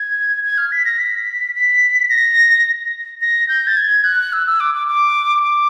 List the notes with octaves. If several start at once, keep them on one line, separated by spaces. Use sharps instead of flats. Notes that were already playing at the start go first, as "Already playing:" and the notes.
Already playing: G#6
G#6
F6
B6
A#6
B6
B6
A#6
A#6
G6
A6
G#6
F#6
E6
E6
D6
D6
D6
D6